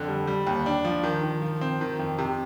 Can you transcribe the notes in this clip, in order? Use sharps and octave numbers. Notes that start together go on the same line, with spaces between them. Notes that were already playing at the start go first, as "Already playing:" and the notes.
Already playing: F2 D3
G3
G3
D#2
D4
F3
D#3
D#3
F3
C4
D#3
F2
C3